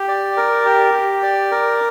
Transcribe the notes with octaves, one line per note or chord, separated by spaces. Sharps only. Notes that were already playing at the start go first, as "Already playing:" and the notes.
Already playing: G4
D5
A#4
G4
G4
D5
A#4